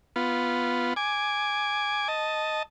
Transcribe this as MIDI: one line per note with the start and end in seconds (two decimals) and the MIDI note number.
0.16 0.94 59
0.16 0.94 65
0.96 2.08 80
0.96 2.08 86
2.08 2.63 75
2.08 2.63 81